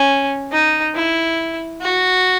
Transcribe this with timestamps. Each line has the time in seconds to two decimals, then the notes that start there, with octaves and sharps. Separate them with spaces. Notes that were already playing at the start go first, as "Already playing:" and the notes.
Already playing: C#4
0.52 D#4
0.95 E4
1.82 F#4